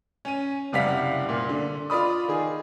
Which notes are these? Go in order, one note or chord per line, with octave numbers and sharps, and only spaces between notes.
C#4 D#7
F#1 C3 G3 F5 F#5 B6
A#2
D3
F4 D5 B5 D#6
D#3 G#4